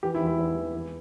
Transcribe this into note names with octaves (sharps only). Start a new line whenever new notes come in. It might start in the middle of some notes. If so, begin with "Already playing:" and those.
E3 G4
E4
E2
E4
E2
E3
E3